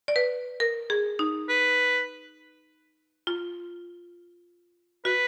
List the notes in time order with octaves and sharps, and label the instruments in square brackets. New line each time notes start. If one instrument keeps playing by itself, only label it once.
[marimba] D5
B4
A#4
G#4
D#4
[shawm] B4
[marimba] F4
[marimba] F#4 [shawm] B4